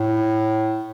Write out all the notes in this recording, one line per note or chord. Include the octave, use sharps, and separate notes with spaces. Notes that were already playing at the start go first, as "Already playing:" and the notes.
Already playing: A2